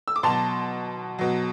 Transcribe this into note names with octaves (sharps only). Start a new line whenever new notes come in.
E6
D6
B2 F#3 A5 C6
B2 F#3